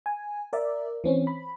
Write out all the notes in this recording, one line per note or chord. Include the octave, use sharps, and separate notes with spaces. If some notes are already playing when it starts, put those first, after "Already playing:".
G#5
A#4 D5 E5
E3 C4 C#4
B5